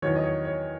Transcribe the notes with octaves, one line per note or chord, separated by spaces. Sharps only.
E2 D#3 F#3 C#5
D#5
C#5
C#5